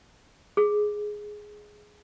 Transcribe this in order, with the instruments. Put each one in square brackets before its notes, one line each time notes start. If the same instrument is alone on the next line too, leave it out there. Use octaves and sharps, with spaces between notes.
[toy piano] G#4